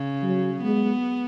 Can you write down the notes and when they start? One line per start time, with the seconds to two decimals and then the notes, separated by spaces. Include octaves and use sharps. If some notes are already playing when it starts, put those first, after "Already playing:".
Already playing: C#3
0.23 F#3
0.63 G#3 B3